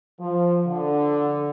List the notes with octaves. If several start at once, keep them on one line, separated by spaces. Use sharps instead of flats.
F3
D3